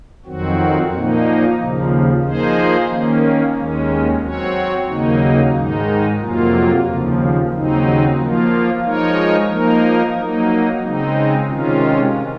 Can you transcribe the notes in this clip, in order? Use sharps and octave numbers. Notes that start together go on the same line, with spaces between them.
F2 D#3 F#3 C4 F#4
A#2 F3 A#3 D#4
D#2 C#3 F3
F3 A#3 D#4 G#4 C5
D#3 A#3 C#4
D#2 D#3 G#3 C#4
F#3 C4 F#4 C#5
D#2 C#3 F#3 A#3 D#4
G#2 D#3 G#3 D#4
F2 C3 F#3 A#3 F4
D#2 C#3 F3
D#2 C#3 F#3 C4 D#4
F3 A#3 F4
F3 G#3 D#4 A#4 C#5
F3 A#3 D#4 A#4
F#3 A#3 D#4
C#3 G#3 C4 D#4
C3 D#3 G#3 C#4 F4